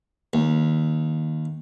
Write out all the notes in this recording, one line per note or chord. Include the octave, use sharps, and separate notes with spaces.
D#2